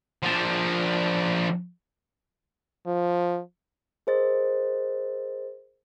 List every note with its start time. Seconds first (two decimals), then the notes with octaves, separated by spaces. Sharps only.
0.23 F3 D4
2.86 F3
4.07 G#4 A#4 C5 D#5 A6